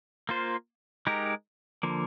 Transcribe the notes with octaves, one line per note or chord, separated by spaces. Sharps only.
A#3 F4 C5
G#3 D#4 G4 A#4
D3 F3 A#3